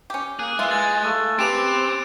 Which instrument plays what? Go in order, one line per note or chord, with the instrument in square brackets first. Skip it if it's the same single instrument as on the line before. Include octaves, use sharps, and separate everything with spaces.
[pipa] C#4 G4
[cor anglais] A#3 [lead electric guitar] G#4 [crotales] F#6
[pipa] E3 F4 [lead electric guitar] G#3 [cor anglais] E5
[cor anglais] G#5 [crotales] A6
[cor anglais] A3
[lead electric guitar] C4 [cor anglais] G4 [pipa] G#4 B4 [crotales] D7 E7 F7